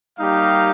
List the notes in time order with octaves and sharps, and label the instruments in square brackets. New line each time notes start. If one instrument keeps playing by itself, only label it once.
[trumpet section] G3 A#3 D#4 G4 F5